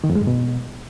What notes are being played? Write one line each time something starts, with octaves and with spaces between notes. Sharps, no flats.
D#3
F2
G#3
G2
B2